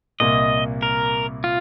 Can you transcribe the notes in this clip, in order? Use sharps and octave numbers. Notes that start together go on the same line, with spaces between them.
C2 A#2 A#3 D#5
A#4
F4